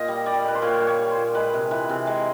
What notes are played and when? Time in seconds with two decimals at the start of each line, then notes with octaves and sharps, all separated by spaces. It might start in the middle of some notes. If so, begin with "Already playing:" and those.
Already playing: A#2 D#5
0.08 G3
0.26 G3 D5
0.44 A#2 B4
0.55 C5
0.62 A#2 C#5
0.80 G3
0.87 C#5
0.99 G3
1.11 C5
1.17 A#2
1.35 G#3 B4
1.54 C3
1.71 E3 B4
1.89 C3
2.07 G#3